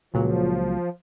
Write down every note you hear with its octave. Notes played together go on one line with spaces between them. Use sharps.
C#2 A#2 F3 F#3